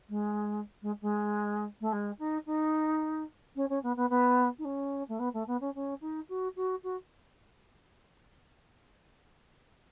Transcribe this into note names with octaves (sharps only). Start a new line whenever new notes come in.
G#3
G#3
G#3
A3
G#3
D#4
D#4
C#4
C#4
B3
B3
B3
D#4
C#4
A3
B3
A3
B3
C#4
C#4
D#4
F#4
F#4
F#4